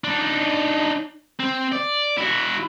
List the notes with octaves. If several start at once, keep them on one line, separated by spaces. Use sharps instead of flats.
D4 D#4
C4
D5
E4 F#4